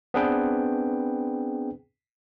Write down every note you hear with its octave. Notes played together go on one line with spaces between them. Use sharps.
B3 C4 D4 G#4 B4 G5